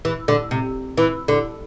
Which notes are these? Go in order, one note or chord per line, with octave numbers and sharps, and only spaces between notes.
E3
D3
C3
E3
D3